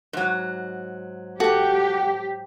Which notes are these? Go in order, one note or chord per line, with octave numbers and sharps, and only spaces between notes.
G#2 F#3
F#4 G4 A4